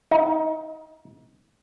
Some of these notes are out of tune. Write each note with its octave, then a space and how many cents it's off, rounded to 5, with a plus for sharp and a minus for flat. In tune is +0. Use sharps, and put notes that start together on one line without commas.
D#4 +25